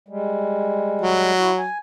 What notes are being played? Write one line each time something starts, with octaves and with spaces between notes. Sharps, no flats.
G3 G#3
F#3
E4 F#4
G#5